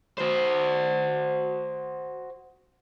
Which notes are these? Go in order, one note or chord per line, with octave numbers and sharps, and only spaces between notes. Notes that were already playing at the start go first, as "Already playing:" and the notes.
F#4 C5